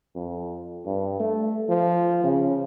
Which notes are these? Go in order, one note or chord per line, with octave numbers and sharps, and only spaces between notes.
F2
G2
A3
F3
C#3